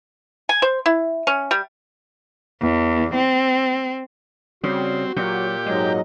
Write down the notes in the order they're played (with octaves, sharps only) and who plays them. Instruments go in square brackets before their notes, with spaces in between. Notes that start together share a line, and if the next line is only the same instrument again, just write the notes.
[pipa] G#5
C5
E4
C#4
G3
[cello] E2
C4
[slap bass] C#3 [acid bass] G3 [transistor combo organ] C4 [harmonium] F#4
[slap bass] A#2 [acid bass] F#3 [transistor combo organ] G4
[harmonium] G#2 F#3 D#5 [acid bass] G#3